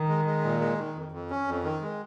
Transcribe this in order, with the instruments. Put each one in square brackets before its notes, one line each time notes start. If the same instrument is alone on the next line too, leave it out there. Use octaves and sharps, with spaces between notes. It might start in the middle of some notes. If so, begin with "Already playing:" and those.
Already playing: [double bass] D#3
[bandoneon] G#3
G#3
A#2
G#3
D#3
F2
F2
C#4
F2
D#3
G#3